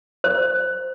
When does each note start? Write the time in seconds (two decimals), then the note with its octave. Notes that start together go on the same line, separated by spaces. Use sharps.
0.24 C5